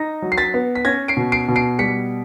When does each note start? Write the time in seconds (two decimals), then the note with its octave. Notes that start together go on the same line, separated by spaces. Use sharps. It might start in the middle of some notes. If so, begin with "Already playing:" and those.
Already playing: D#4 A#6
0.22 F#3
0.32 C7
0.38 A6 B6
0.54 B3
0.75 B6
0.85 C#4 G#6 A#6
1.08 C7 D7
1.17 B2
1.32 C7 D7
1.48 B2
1.56 C7 D7
1.79 G3 B6 C#7